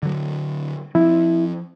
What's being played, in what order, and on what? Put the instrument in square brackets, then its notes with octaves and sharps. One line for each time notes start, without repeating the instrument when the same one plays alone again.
[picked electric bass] D3 F#3
[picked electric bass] F3 C4 [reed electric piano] E4